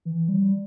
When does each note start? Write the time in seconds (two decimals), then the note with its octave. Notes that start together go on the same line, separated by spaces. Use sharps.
0.05 E3
0.28 G3